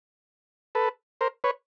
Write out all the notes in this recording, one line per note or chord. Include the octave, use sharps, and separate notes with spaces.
A4 B4
A#4 C5
B4 C#5